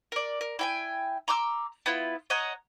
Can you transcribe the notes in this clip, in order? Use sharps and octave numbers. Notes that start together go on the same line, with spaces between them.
A#4 D5
A#4
E4 G5 G#5
A#5 C6 D6 E6
B3 E4 F4
C#5 D#5 F#5 A#5